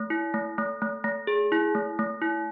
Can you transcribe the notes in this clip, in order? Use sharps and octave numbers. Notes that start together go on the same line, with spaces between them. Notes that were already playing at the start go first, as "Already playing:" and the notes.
Already playing: A3
E4
A3
A3
A3
A3
G#4
E4
A3
A3
E4